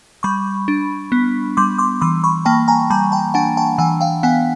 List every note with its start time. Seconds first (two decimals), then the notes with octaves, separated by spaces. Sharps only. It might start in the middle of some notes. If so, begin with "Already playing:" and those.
0.23 G3 B5 C#6
0.68 D4
1.12 B3
1.57 G3 C6 D6
1.78 C6 D6
2.01 E3 C6 D6
2.24 B5 C#6
2.45 A#3 G5 A5
2.68 G#5 A#5
2.90 G3 A5 B5
3.12 G5 A5
3.34 D4 F#5 G#5
3.57 G5 A5
3.78 E3 F#5 G#5
4.01 F5 G5
4.23 B3 F#5 G#5